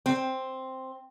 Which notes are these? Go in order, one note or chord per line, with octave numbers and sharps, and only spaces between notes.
C4